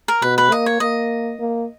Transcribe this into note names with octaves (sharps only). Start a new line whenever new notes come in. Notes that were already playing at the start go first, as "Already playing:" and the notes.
A#4
B2 B4
B4
A#3 D#5
C#5
A#3 D#5
A#3